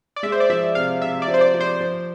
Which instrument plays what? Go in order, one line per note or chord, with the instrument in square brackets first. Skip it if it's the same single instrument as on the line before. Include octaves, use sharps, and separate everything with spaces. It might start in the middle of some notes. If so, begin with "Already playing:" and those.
[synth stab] D5
[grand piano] G#3 [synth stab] E5
[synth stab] C5
D5
[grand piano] F3 [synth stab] E5
[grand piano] C3 [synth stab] F5
[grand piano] C3 [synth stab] E5
[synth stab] D5
[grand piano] F3
[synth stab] C5
D5
[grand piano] F3
[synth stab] C5
[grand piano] F3